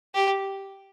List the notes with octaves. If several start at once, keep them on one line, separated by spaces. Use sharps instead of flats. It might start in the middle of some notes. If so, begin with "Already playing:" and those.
G4